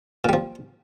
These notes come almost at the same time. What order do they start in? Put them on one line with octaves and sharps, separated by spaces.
A#2 G3 F3